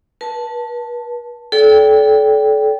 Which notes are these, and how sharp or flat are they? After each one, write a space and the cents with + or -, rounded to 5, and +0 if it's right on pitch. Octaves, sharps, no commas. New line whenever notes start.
B4 -45 A5 +0
A4 -30 D5 -40 G5 +0